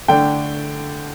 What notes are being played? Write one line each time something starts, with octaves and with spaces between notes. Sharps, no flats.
D3 A3 D4 G5